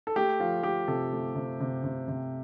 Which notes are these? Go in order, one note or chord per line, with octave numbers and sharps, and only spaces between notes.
A4
A3 G4
F3 F4
A3 G4
C3 A4
A3
C3
C3
C3
C3